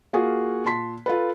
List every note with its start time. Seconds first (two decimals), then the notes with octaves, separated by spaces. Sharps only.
0.13 A#3 F4 F#4 G#4
0.65 A#2 A5 C6 B6
1.06 F4 A4 B4